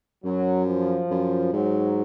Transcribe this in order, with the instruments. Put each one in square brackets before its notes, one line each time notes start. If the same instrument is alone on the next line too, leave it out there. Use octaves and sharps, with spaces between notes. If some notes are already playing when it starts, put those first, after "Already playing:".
[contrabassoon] F#2 [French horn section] F#3
[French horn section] F3
[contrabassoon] F#2
[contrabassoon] G#2 [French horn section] F#3